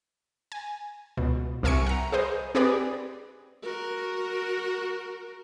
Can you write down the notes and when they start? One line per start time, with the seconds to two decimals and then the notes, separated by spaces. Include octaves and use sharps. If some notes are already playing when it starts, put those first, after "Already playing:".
0.52 G#5
1.17 C#2 B2
1.63 C2 A#4 E5 G#5 C#6 C#7
1.87 F#5 A#5
2.12 G#4 B4 C5 D#5
2.55 C4 G4 G#4 B4 D5
3.63 F#4 A#4